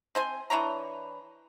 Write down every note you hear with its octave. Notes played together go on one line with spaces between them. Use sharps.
C4 C5 G#5
E3 D4 C#5 A#5